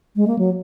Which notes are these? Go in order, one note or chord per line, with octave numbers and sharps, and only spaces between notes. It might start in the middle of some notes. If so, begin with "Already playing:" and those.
G#3
A#3
F#3